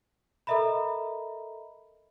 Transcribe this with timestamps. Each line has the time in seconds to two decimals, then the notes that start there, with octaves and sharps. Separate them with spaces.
0.47 A4 A#4 D#5 E5 A#5 B5